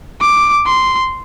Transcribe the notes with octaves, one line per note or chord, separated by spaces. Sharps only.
D6
C6